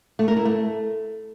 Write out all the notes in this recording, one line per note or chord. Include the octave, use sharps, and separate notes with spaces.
A3
A#4
E4
A3